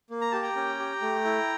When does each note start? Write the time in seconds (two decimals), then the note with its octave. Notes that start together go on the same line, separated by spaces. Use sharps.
0.10 A#3
0.21 A#5
0.31 G4 A5
0.42 G5 A#5
0.56 C#4
0.79 G4
1.02 A3
1.25 E4